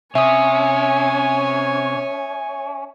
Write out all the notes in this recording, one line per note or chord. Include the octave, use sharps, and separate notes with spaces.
C3 C#4 C#5 E5 G#5 D#6